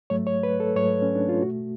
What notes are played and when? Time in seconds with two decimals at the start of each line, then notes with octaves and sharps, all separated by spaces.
0.10 G#2 F#3 A3 C#5
0.27 C#5
0.43 B4
0.60 A4
0.76 G#2 F#3 A3 C#5
1.02 C#4
1.15 D4
1.29 F4
1.42 B2 A3 F#4